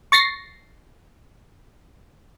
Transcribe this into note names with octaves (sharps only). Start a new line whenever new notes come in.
C#6 A6 A#6 C7